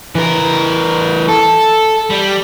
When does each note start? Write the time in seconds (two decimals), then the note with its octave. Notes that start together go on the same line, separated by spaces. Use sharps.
0.15 E3 A#4
1.29 A4
2.10 G3